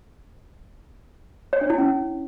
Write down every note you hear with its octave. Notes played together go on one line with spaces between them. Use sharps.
C#5
D4
E4
C#4